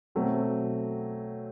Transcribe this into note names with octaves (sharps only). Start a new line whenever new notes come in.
B2 F#3 A3 C4